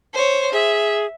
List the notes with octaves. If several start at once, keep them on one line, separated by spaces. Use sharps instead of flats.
C5 C#5
G#4 E5